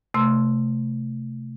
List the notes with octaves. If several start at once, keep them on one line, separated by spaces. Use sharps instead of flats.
C3 A3 C6 E6